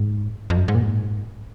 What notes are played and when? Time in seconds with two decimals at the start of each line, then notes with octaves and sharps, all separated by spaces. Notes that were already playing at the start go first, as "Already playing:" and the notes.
Already playing: G#2
0.50 F2
0.57 F#2
0.68 G#2
0.75 A#2
0.83 G#2